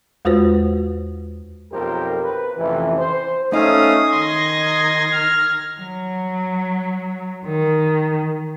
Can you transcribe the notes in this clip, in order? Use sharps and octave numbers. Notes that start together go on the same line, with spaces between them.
E2 G#3 F4 F#4 B4 C5
B1 F2 F4 G4 A#4 C5
B4
A1 F2 C3 E3
C5
A3 C#4 D#4 F5 D#6
D#3 D#5 C6 G#6 A#6
F6
F#3
D#3